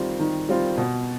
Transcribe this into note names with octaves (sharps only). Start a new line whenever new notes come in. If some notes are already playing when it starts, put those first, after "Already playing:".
Already playing: D#3 G3 C4 F4
D#3
G3 C4 F4
B2